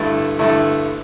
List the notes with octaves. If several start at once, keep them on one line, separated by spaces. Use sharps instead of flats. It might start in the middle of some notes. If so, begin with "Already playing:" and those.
Already playing: G2 D3 A3 E4
G2 D3 A3 E4